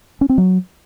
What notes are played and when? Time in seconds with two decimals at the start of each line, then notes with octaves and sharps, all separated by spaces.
0.21 C#4
0.29 C4
0.38 F#3